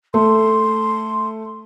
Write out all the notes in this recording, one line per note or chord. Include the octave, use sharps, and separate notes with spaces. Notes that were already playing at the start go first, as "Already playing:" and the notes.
A3 C6